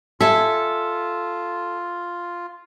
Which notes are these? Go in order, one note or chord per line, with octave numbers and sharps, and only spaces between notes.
F4 A4 E5 G#5 E6 B6